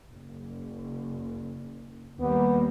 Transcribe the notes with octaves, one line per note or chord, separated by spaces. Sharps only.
F#1
D#2 G3 A#3 B3